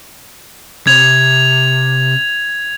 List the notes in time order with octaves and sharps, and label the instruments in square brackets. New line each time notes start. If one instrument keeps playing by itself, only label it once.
[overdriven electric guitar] C3 [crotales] G#6 F7